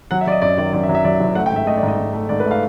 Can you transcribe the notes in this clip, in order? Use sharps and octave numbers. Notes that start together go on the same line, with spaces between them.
F#3 F#5
E5
F#3 D5
D#5
F#2 D5
D#3 D5
F#2 D5
E5
F#3
E5
F#3 D5
F#1
A3 F#5
G5
G#2 E5
A3 D#5
D5
G#2
D#5
G#2
A3
G#2 D5
B4
A3
F5